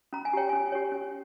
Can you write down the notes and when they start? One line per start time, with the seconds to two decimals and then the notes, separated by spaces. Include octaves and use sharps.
0.13 C#4 A#5
0.25 G#5
0.33 G4 C#5 G5
0.49 C#4 G#5
0.72 G4 C#5
0.92 C#4